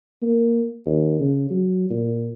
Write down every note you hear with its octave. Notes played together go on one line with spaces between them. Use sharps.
A#3
D#2
C#3
F#3
A#2